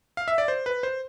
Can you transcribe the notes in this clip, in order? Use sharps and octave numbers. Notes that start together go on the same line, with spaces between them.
F5
E5
D5
C5
B4
C5